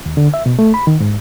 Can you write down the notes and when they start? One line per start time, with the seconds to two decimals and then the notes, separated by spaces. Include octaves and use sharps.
0.06 D#2
0.17 D3
0.34 E5
0.46 B2
0.59 A3
0.74 B5
0.87 D#3
1.00 G#2